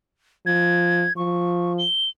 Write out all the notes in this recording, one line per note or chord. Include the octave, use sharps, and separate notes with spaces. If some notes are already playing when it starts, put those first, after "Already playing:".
F3 G#6
F3 C#6
G7